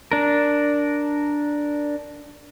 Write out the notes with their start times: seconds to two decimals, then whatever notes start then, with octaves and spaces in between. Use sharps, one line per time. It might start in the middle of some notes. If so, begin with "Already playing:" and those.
0.12 D4 A#4